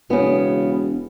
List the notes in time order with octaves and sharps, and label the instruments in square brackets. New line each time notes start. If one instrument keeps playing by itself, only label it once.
[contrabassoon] E1 [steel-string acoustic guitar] C#3 B3